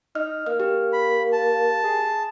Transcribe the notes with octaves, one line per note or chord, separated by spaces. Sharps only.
D#4 F6
A#3 F6
G4
B5
A5
G#4